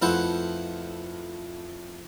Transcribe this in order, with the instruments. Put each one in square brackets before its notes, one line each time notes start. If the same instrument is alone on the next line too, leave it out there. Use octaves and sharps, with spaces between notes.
[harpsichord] F2 A3 E4 B4 C5 F#5